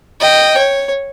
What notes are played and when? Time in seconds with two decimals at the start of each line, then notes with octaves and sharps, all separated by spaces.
0.21 D#5 G5
0.58 C#5